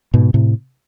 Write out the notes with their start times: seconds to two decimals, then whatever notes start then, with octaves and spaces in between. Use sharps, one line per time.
0.14 G#2 B2
0.34 A2 C3